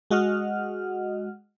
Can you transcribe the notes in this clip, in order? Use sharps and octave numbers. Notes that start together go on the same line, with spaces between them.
G#3 F#4 D#5 F#5 F6